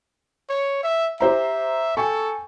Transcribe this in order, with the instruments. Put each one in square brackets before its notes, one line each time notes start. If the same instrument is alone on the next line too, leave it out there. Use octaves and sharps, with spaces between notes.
[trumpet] C#5
E5
[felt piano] G4 C5 A#5 [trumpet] E5
[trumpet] A4 [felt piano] G5 G#5 C#6